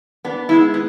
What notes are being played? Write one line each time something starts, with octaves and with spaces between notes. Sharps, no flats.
B3 D4
G#3 E4
B3